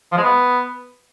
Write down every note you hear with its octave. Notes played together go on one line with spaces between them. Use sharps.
F3
G#3
B3